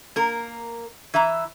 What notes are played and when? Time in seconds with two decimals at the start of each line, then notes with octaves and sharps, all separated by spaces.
0.16 A#3 A#4
1.14 E3 E5 A#5